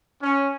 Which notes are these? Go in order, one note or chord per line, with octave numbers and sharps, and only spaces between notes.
C#4